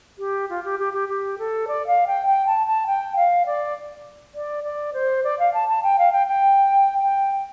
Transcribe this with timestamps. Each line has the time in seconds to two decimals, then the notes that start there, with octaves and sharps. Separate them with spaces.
0.19 G4
0.50 F4
0.64 G4
0.79 G4
0.93 G4
1.09 G4
1.39 A4
1.68 D5
1.87 F5
2.07 G5
2.27 G5
2.46 A5
2.67 A5
2.87 G5
3.16 F5
3.46 D5
4.35 D5
4.64 D5
4.94 C5
5.24 D5
5.39 F5
5.54 A5
5.69 A5
5.83 G5
5.99 F5
6.13 G5
6.27 G5
7.03 G5